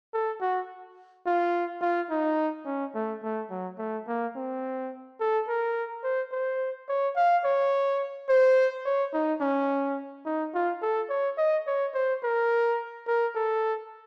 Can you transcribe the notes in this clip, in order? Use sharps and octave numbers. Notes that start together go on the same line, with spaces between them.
A4
F#4
F4
F4
D#4
C#4
A3
A3
F#3
A3
A#3
C4
A4
A#4
C5
C5
C#5
F5
C#5
C5
C#5
D#4
C#4
D#4
F4
A4
C#5
D#5
C#5
C5
A#4
A#4
A4